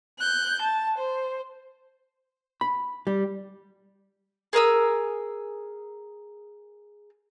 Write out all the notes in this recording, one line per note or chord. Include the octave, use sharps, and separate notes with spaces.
F#6 G6
A5
C5
B5
G3
G#4 A#4 D#6 E6